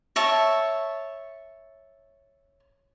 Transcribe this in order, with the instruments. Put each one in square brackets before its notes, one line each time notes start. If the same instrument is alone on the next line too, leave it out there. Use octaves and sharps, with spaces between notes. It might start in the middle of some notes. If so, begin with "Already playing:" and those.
[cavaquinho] C#5 E5 A5